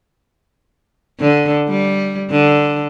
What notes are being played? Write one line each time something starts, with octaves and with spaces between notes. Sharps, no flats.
D3
G3
D3